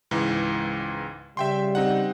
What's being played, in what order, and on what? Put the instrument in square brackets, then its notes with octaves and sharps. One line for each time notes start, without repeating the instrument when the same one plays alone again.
[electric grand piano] C#2 G#2 E3
[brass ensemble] C#3 G3 [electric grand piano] E5 G5 C6
[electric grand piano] C4 D#4 F#5